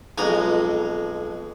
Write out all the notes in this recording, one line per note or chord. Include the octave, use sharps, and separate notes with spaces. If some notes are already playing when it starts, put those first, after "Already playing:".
B1 F2 G#3 A#5